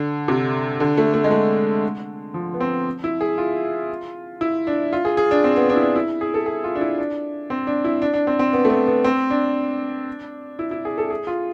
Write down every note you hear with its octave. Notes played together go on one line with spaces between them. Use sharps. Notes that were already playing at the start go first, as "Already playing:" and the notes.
Already playing: D3
C3
D3
A3
A3
G#3
A3
F3
B3
C4
E4
G#4
F4
E4
D4
F4
G#4
G#4
D4
C4
B3
D4
E4
D4
E4
G#4
A4
G#4
F4
D4
E4
D4
C4
D4
E4
D4
D4
C4
C4
B3
A3
B3
B3
C4
D4
E4
E4
G#4
A4
G#4
F4